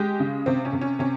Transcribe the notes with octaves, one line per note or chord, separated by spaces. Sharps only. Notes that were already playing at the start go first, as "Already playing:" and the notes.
Already playing: G#3 G4
C#3
C3 C4
C#4
C3
C#4
C3 C#4